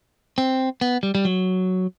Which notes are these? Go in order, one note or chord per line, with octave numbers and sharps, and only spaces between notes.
C4
B3
G3
G3
F#3